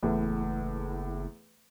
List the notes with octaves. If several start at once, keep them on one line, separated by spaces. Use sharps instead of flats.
F#1 E2 A2 A3